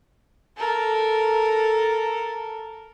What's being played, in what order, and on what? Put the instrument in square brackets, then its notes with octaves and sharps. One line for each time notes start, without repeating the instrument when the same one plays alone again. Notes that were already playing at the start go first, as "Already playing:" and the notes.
[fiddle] A4 A#4